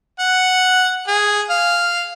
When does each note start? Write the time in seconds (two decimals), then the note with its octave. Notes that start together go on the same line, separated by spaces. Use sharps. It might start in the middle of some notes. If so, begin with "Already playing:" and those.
0.19 F#5
1.08 G#4
1.50 F5